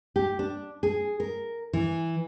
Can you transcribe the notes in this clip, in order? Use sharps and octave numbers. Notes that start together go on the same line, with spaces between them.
G4
D4
G#4
A#4
E3